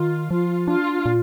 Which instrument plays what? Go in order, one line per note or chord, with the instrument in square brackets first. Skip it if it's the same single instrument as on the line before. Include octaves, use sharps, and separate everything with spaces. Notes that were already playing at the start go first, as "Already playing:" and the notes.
Already playing: [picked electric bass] D#3 [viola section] F4
[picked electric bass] F3 [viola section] F4
[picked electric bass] D4 [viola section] F4
[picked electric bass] A#2